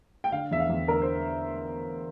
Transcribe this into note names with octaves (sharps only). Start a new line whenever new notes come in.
G5
D3 F5
E2 E5
F5
E2
D3 A#4
C5